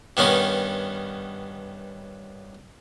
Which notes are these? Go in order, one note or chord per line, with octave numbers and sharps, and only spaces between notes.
G2 D#3 B3 C#4 D#4